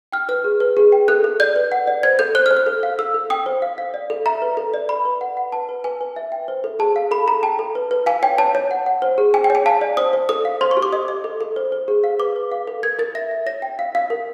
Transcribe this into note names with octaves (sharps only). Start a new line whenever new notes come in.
G5 F6
B4 F6
G#4
B4
G#4
G5
A4 F#6
A4
D5 G6
B4
F#5
D5
C5 G#6
A4 G6
C5 F#6
F6
C5
F6
A4
F5
A4 E6
A4
G5 D#6
C5
F5
F5
D5
A4
E5 A#5
B4
A4
D5
B4 B5
B4
F#5
F#5
B4 A5
B4
B4 G#5
B4
E5
G5
C5
A4
G#4 A5
F5
A4 B5
A4 A#5
G5 A5
A4
B4
B4
F5 G#5
C#5 G5
C#5 A5
C#5
F#5
F#5
C5
G#4
G5 G#5
G5
C#5 G#5
F5 A5
D5
C5 D#6
C5
A4 D#6
F5
C5 C6
C#6
G4
D6
D#5 D#6
D#5
A4
A4
C5
C5
G#4
F5
B4 D6
B4
F5
A4
A#4 G#6
A#4 A6
E5 A#6
E5
C#5 A#6
G5
F5
F5
A#4